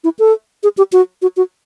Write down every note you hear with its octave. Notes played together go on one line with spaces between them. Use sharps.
E4
A4
G#4
G4
F#4
F#4
F#4